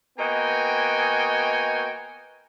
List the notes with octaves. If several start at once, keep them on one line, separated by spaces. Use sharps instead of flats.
A#3 B3 F#4 D#5 G5 G#5